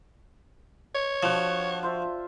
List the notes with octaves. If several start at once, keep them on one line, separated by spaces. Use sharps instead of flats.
C#5
F3 D4 F#4
F4 C5 E5